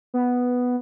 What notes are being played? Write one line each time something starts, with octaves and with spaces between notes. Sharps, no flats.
B3